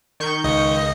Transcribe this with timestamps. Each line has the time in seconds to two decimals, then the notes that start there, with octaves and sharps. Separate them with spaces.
0.20 D#3 C#6 G6
0.44 C#2 D#5